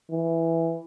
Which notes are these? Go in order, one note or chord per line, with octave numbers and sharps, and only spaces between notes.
E3